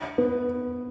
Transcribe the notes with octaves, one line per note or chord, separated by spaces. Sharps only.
B3